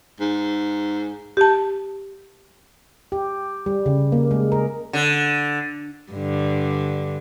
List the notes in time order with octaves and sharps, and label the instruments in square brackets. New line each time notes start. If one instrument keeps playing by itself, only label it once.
[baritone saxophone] G#2
[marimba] G4 A5
[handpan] G4
G3
C#3
A#3
G#3
A#4
[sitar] D3
[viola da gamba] G2 D3